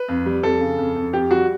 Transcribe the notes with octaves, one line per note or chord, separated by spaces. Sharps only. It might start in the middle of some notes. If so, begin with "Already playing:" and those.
Already playing: B4
F2
G3
F2 A4
C#3
F2
F2
F2 G4
G3 F#4